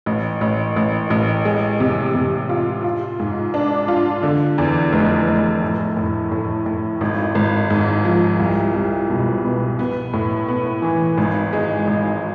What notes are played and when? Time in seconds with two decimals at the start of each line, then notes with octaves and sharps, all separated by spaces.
0.06 A1
0.41 A1
0.76 A1
1.10 A1
1.45 G#3
1.80 C3
2.15 C3
2.49 F4
2.84 F4
3.19 G#2
3.54 D4
3.88 F4
4.23 D3
4.58 E2
4.93 F1
5.27 F1
5.62 A2
5.97 A2
6.31 A2
6.66 A2
7.01 G#1
7.35 G#1
7.70 G#2
8.05 F3
8.40 C2
8.74 C2
9.09 B2
9.44 B3
9.79 B3
10.13 A2
10.48 B3
10.82 E3
11.18 G#1
11.53 G#3
11.87 G#1